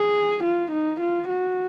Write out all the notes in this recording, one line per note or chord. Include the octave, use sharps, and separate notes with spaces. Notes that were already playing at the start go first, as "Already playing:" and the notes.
Already playing: G#4
F4
D#4
F4
F#4